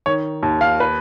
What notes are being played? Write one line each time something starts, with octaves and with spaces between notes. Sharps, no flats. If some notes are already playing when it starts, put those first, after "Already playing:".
D#3 C#5
D#2
F5
B4